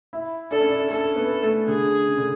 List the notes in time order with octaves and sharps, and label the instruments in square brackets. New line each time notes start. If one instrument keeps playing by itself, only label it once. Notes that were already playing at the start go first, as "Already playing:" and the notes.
[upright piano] E4
[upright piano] D4 [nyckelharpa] A4
[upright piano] C#4
D4
[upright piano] C#4 [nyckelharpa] A4
[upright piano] B3
A3
[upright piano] D3 [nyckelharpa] G#4
[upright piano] C#3
D3